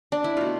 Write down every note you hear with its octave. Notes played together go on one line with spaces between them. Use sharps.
D4
E4
B2 A3 F4